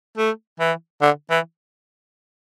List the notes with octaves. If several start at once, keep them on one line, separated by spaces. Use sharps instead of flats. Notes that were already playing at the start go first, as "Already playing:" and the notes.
A3
E3
D3
E3